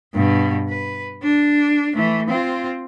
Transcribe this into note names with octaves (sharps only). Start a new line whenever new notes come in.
G2 B2
B4
D4
E3 A3
C4 F4